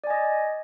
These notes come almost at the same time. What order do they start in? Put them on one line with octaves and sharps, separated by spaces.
D5 G#5 D#5